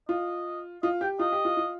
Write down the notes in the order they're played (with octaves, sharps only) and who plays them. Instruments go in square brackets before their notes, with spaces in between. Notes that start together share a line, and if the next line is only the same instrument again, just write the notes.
[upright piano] F4 [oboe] D#5
[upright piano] F4 [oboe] D#5
[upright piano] G4 [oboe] G5
[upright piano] F4 [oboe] D#5
[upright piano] G4
F4
F4